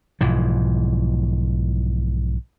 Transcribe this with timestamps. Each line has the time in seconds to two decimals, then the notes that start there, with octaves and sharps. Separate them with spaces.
0.21 B1 G#2 E3 F3